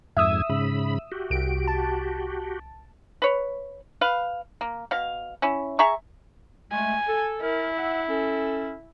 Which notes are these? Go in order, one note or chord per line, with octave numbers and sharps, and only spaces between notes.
F2 G#2 E5 D#6 E6 G#6
G#2 C#3 B5
F#4 G4
C2 D7
A5
B4 C#5
B4 F5
A#3
B2 F5
C#4 E4
G#4 E5 A#5 C#6
G#3 A3 G#5
A4
E4 A#4
E5 F#5
C#4 A4